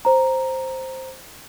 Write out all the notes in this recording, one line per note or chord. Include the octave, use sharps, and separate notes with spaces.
C5 A#5